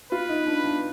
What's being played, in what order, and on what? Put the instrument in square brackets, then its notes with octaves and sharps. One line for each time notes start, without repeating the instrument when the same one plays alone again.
[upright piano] F4 [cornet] B4
[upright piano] D#4
D4
D4